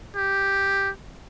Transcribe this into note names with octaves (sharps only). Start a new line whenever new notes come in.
G4